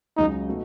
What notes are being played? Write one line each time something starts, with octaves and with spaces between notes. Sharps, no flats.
C#2 C#3 F#3 D#4
B2 A3 D#4